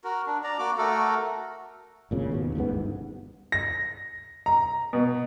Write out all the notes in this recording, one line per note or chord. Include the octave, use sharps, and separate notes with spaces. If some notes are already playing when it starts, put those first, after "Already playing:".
F#4 A#4
D4
D5 A#5
A#3 F#4 D6
A3 F#4 A4 A#4
G#1 A#2 C#3
D#2 B2
D1 A1 G#2 B3
G1
A#6
A#5
B2